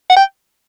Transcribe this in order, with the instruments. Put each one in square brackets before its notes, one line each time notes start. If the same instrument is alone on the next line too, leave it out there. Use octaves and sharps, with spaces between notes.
[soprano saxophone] F#5
G5